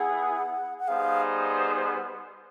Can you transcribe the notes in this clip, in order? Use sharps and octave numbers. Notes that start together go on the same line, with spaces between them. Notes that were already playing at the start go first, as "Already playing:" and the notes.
Already playing: B3 E4 G#4 F#5
F#5
G3 B3 D#4 G#4 C5 F5